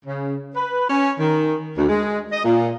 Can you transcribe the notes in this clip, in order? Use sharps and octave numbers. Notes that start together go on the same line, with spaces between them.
C#3
B4
C#4
D#3
D2
G#3
D#5
A#2